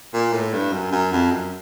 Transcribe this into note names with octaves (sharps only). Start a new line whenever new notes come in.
A#2
A2
G2
F#2
F#2
F2
F#2